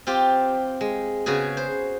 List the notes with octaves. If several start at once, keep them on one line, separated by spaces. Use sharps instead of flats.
C4 F4 G4
G#3
C#3 B3 F#4 G#4
C5